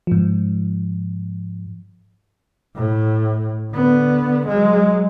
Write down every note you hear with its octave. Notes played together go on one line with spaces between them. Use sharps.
G#2 F3
A2
D3 B3
F#3 G#3